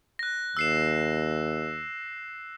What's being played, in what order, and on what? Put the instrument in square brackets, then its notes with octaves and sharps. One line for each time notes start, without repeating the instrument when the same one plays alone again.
[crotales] F#6 A#6
[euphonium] D#2 [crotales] E6 C7 E7